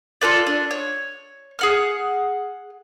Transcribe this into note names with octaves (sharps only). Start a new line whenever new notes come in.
F4 A4 B4 D5
D4
C#5
G#4 F#5 F6